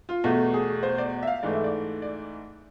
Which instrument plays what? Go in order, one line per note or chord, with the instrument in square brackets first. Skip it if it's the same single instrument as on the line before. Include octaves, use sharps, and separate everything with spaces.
[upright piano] F4
E2 B2 A3
G#4
C5
D5
E5
F5
G#2 E3 A3 D5
E5
D5
D5